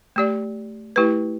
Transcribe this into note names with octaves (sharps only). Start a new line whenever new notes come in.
A3 G4 D5
A3 E4 G4 B4